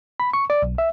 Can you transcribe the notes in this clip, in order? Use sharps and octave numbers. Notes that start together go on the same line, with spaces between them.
B5
C#6
D5
B1
E5